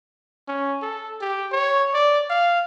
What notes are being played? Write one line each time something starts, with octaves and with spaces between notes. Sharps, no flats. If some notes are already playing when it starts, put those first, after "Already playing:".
C#4
A4
G4
C#5
D5
F5